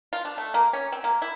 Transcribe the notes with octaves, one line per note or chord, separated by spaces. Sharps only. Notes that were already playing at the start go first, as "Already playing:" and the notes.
F4
D4
A3
A#3
C#4
C4
A#3
E4